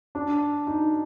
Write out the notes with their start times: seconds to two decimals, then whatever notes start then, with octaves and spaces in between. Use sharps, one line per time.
0.15 D4
0.67 D#4